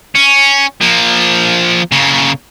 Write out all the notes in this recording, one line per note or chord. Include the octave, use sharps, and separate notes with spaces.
C#4
F3 A#3
C#3 A#3